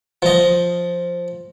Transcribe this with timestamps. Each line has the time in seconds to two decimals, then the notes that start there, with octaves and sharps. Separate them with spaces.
0.22 F3 D#5